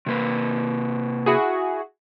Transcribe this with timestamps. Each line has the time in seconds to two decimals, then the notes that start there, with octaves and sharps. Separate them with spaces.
0.06 C3 A#3 B4
1.26 E4 F#4 G#4